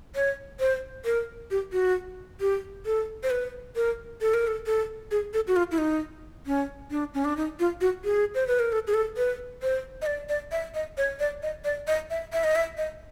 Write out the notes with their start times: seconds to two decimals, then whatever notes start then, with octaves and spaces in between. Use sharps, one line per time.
0.15 C#5
0.60 C5
1.05 A#4
1.51 G4
1.73 F#4
2.41 G4
2.86 A4
3.23 C5
3.30 B4
3.76 A#4
4.21 A4
4.34 A#4
4.47 A4
4.67 A4
5.11 G#4
5.33 A4
5.47 F#4
5.56 F4
5.71 E4
5.78 D#4
6.46 C#4
6.91 D4
7.14 C#4
7.25 D4
7.37 D#4
7.60 F4
7.81 F#4
8.04 G#4
8.35 C5
8.48 B4
8.60 A#4
8.72 A4
8.87 G#4
8.94 A4
9.17 B4
9.62 C5
10.02 D#5
10.06 D5
10.29 D5
10.52 E5
10.75 D#5
10.98 C#5
11.20 D5
11.43 D#5
11.65 D5
11.87 D#5
12.10 E5
12.33 E5
12.44 D#5
12.55 E5
12.77 D#5